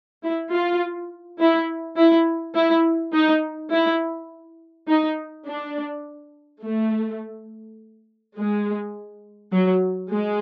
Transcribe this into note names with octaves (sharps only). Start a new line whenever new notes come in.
E4
F4
E4
E4
E4
D#4
E4
D#4
D4
A3
G#3
F#3
G#3